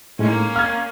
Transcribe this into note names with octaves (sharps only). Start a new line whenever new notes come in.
A2 G#3 A#3 C#4 D#4
F5 F6 G#6